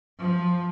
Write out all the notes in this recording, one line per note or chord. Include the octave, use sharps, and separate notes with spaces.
F3